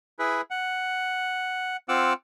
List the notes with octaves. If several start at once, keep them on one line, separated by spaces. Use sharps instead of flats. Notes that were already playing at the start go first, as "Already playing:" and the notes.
E4 G#4 B4
F#5
C4 F4 F#5 D6 E6